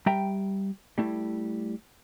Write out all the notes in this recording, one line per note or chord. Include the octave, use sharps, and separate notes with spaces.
G3 E5 G5 A#5
G3 A3 E4